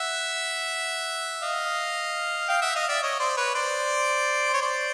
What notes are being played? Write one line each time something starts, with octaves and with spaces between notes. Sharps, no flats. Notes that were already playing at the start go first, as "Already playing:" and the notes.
Already playing: E5 F#5
D#5 F5
F5 G5
E5 F#5
D#5 F5
D5 E5
C#5 D#5
C5 D5
B4 C#5
C5 D5
C#5
C5 D5